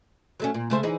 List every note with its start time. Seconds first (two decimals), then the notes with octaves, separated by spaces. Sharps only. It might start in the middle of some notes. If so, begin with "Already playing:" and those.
0.40 F#3 A3 C#4
0.54 A#2
0.70 C#3 A3 C5
0.83 E3 D#4 G#4